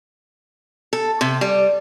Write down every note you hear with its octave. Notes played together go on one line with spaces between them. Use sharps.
A4
C3
G3